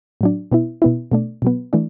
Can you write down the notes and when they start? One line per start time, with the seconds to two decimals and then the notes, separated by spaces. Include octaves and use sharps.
0.21 A2 F#3 D4
0.51 B2 B3 E4
0.82 B2 B3 E4
1.12 B2 A3 D4
1.42 B2 F#3 B3
1.73 E3 A3 D4